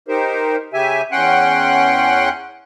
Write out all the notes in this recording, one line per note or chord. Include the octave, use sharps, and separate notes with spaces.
D#4 G4 A#4 C5
C#3 G4 E5 G#5
E2 C#4 F#5 G5 C6 F#6